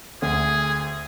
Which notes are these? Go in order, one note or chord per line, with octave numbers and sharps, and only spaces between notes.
D2 G#4